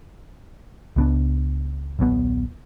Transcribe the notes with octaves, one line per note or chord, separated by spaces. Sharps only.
C#2 B3 D4
D#1 B1 B2 B3